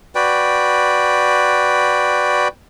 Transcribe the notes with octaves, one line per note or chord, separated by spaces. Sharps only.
F#4 B4 D5 G5